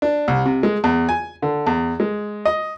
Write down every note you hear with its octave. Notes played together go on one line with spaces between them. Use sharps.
D4
C2
C3
G#3
E2
G#5
D3
E2
G#3
D#5